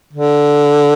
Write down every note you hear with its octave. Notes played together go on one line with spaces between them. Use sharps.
D3